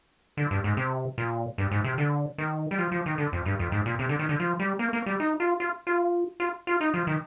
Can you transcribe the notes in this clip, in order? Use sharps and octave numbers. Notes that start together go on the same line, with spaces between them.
D3
G2
G#2
C3
A#2
G2
G#2
C3
D3
D#3
G3
F3
F3
D#3
D3
F2
G2
F2
G#2
A#2
C3
D3
D#3
D3
F3
G3
A#3
A#3
G3
D#4
F4
F4
F4
F4
F4
D#4
F3
D#3